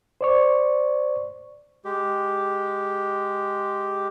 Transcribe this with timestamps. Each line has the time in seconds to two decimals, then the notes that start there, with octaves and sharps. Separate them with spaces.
0.21 C5 D5 C#6
1.85 G#3 G4